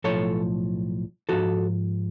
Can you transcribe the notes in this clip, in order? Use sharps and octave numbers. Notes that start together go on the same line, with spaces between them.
B1 A2 F3 A4 C#5
G#2 F3 F#4 A4